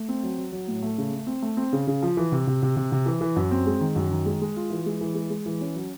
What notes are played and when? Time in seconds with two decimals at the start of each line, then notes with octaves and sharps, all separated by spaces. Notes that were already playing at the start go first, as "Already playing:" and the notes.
Already playing: A3
0.09 C4
0.23 F#3
0.38 F#3
0.52 F#3
0.68 A2
0.82 A3
0.98 C#3
1.13 A3
1.27 C4
1.42 A3
1.57 C4
1.73 C#3
1.87 C#3
2.02 F3
2.17 E3
2.32 C3
2.47 C3
2.62 C3
2.76 C3
2.92 C3
3.06 E3
3.21 E3
3.36 F#2
3.51 C4
3.66 G#3
3.81 D#3
3.96 F#2
4.11 D#3
4.26 G#3
4.42 G#3
4.56 F4
4.70 E3
4.86 G#3
5.01 E3
5.15 G#3
5.30 G#3
5.46 E3
5.61 C#4
5.76 F#3